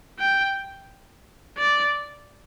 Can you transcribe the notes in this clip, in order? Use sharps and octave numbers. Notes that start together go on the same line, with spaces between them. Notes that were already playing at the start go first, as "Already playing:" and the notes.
G5
D5